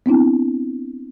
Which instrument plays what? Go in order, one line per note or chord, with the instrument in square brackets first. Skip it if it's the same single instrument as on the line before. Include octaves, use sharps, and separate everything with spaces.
[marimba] B3 C4 D4 E4